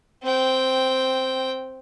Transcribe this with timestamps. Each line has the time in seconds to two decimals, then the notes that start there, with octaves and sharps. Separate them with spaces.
0.23 C4 G5